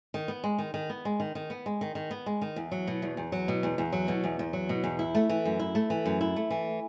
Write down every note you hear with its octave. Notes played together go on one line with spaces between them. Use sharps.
D#3
B3
G#3
D#3
D#3
B3
G#3
D#3
D#3
B3
G#3
D#3
D#3
B3
G#3
D#3
E2
F#3
B2
E2
E2
F#3
B2
E2
E2
F#3
B2
E2
E2
F#3
B2
E2
E4
A3
E3
F#2
E4
A3
E3
F#2
E4
A3
E3